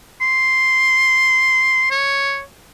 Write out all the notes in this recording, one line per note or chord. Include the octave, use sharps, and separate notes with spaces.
C6
C#5